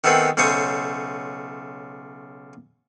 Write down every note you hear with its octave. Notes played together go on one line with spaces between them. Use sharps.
D#3 A3 B3 C4 G#4
B1 C#3 A3 C5 C#6 D#6